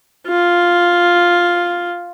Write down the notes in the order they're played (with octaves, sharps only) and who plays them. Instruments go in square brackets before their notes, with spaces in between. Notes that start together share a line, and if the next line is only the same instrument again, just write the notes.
[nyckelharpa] F4